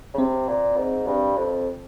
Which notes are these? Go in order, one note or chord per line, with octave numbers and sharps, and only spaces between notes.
C#3
C3 C4
A#2
G#2
G2
F2